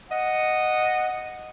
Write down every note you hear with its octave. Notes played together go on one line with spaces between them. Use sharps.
D#5 F#5